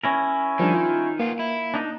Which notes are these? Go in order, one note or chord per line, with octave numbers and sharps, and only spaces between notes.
C#4 E4 A#4
D#3 F3 G3 D4
F4
A#3 B3 F4
E4
D4 D#4